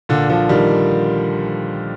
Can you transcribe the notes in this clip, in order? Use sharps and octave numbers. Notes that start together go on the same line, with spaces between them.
A#2 D3
D3 F3
D#3 G3